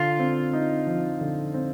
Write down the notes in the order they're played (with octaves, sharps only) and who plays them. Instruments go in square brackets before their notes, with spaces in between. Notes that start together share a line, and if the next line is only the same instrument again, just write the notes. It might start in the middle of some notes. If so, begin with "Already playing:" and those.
Already playing: [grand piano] D3 [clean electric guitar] F4
[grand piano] C4
D#4
F3
D3
C4